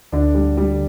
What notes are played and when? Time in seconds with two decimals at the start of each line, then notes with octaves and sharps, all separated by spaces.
0.12 D2 D3 D4
0.35 G3
0.57 G3